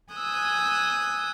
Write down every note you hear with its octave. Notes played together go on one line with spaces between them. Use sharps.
G#5 D#6 E6 F#6 G6